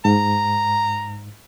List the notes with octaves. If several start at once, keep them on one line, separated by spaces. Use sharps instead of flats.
G#2 A#5